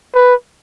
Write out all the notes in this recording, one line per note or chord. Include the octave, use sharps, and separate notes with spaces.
B4